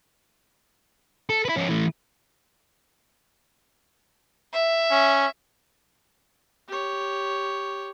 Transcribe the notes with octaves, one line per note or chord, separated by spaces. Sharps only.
A4
E4 B4
F3 C#4
E3 A3
E5
C#4
G4 C#5